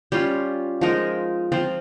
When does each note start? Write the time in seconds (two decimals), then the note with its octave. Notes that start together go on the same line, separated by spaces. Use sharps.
0.12 G3 C#4 F4
0.81 F3 G#3 D#4 A#4
1.52 F3 C4 F4